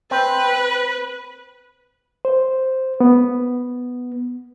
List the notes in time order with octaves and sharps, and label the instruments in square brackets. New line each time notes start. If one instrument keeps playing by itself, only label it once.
[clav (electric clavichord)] C4 [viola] B4
[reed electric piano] C5
B3